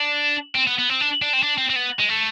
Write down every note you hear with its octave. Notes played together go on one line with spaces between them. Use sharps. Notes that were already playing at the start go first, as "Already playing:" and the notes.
Already playing: D4
C4
B3
B3
C4
D4
D4
C4
D4
C4
C4
B3
G#3
A3